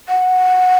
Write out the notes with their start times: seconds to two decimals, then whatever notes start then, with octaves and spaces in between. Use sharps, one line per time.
0.09 F#5